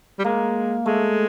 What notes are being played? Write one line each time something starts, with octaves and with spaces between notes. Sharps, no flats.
G3
G#3 A#3
G#3 A3